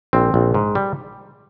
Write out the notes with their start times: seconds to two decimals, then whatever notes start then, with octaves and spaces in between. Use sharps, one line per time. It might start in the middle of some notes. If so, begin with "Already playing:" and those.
0.13 A#1 C4
0.34 A#1
0.54 G#2
0.75 G3